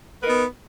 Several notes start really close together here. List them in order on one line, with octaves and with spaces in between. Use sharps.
B4 A#4 D#4 B3